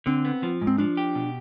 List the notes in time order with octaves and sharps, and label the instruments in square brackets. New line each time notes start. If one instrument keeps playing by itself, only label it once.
[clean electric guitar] D3 [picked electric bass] C4
[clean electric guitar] B3
F3
G#2
[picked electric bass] C4
[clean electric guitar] F3 [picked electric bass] D4
[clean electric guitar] G4
B2